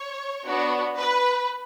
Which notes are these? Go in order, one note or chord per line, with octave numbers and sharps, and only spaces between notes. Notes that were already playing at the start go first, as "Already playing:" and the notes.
Already playing: C#5
B3 D4 F#4
B4